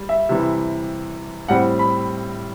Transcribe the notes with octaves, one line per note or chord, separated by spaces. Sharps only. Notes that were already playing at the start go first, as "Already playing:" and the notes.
Already playing: G3
E5
C3 E3 G3
A2 G3 C4 F#5
B5